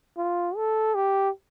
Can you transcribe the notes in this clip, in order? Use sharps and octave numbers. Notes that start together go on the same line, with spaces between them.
F4
A4
G4